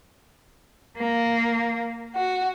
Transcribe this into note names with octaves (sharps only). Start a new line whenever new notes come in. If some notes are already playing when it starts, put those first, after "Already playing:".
A#3
F#4